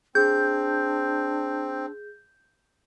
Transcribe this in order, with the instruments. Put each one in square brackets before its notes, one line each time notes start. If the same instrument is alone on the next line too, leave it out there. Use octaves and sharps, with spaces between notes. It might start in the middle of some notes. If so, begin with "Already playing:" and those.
[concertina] C4 [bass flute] D4 [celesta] G#4 [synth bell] G6